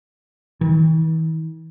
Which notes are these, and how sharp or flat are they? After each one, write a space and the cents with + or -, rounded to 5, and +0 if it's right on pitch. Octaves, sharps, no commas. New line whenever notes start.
E3 -45